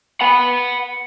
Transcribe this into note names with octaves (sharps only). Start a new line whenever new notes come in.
F#5 B5